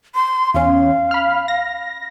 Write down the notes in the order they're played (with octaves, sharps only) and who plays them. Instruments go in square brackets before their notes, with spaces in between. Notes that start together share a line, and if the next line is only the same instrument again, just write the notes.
[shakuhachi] C6
[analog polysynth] E2 C#4 [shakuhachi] F5
[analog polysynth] B5 F6
A#6